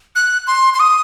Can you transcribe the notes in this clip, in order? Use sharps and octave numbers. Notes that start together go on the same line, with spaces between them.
F#6
C6
C6
D#6